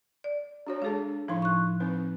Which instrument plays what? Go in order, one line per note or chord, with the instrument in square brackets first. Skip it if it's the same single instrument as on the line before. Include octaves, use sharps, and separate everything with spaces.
[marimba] D5
[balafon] D4 F#4 C#5
[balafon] G#3 G#4 A5 [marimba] D4 A4
[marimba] A2 F3 [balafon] D#4 E4 C6
[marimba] C#6 F#6
[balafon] C4 D#4 B4